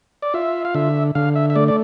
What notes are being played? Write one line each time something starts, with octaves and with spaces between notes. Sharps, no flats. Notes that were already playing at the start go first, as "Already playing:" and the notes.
D5
F4 E5
F5
D3 E5
D3 F5
E5
E5
A3 D5
D5